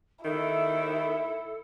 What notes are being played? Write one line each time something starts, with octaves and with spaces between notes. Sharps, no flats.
D#3 E4 A4 E5